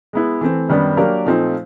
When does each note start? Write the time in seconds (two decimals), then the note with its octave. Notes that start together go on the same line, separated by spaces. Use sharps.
0.13 G#3 B3 E4
0.41 E3 A3 C4
0.69 F#2 D#3 G3 B3 D4
0.97 F#3 A#3 D4 G4 A#4
1.26 A#2 F3 A3 C4 D#4